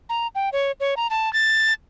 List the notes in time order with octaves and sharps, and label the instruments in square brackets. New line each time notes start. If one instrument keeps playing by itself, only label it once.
[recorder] A#5
G5
C#5
C#5
A#5
A5
A6